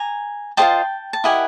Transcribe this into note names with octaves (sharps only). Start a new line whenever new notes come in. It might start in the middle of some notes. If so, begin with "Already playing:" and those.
Already playing: G#5 A#5
F4 G#4 C5 D#5 G5 A5
A5
E4 G4 A#4 D#5 F#5 G#5